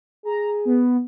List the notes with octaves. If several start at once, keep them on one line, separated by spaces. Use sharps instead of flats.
G#4 A#5
B3